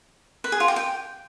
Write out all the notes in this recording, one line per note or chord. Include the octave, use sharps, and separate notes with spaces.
B4
G#4
F4
G4
G5